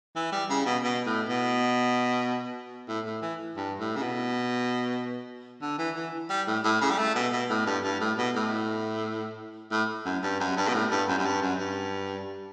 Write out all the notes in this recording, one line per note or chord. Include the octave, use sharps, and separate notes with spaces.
E3
G3
C#3
B2
B2
A2
B2
A2
A2
E3
G2
A2
C#3
B2
D3
E3
E3
G3
A2
A2
C#3
G3
A3
B2
B2
A2
G2
G2
A2
B2
A2
A2
F#2
G2
F#2
G2
B2
A2
G2
F#2
F#2
G2
F#2
G2